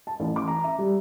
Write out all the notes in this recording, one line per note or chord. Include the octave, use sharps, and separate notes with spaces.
A5
A1
D6
A#5
E5
G3